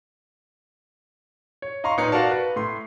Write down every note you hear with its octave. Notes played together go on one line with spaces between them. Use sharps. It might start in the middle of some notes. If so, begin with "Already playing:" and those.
C#5
D#5 F5 A#5 C6 C#6
A#2 D#4 B4 C#5 C#7
F#4 A#4 D5 F5 A5
B4
A2 C6